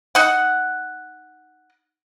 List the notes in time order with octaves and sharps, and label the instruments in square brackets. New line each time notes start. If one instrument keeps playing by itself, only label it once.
[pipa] D#4 F#5